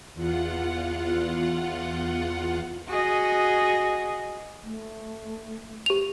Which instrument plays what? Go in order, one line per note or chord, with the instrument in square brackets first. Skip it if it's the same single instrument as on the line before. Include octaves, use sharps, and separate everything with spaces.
[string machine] E2 F4 F#5
[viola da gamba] F#4 G#4 D#5
[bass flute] A3
[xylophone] G4 F7